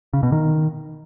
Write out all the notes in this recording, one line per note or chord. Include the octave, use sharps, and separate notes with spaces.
C#3
B2
D#3